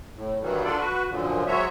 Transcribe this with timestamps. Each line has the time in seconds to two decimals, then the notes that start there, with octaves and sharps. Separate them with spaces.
0.16 A2
0.42 G2 D#3 E3 F#3 G3
0.64 D4 F4 A4 D5
0.78 F#4 B4
1.10 F#2 A#2 D3 F3
1.47 F#3 G#3 C4 F#4 C#5 E5